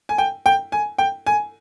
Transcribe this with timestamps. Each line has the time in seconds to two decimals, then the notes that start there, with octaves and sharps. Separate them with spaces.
0.09 G#5
0.18 G5
0.46 G5
0.72 G#5
0.98 G5
1.26 G#5